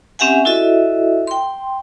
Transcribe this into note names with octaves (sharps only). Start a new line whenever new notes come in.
C4 C#4 G4 E5 F#5 G#5
E4 F#4 A4 D#5 E5
G5 C6